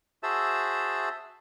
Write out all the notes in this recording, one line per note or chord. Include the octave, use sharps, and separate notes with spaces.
F#4 G#4 C5 E5 A5 E6